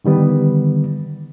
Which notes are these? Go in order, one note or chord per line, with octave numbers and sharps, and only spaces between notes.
D3 D#3 G3 B3